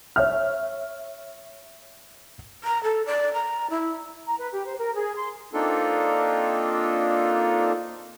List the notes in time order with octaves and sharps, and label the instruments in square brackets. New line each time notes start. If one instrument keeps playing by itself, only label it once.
[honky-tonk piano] C#5 E5 F6
[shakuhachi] A#5
A4
D5
A#5
E4
[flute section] A#5
B4
G4
C5
A#4
G#4
C6
[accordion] A#3 C4 D4 D#4 F4 A4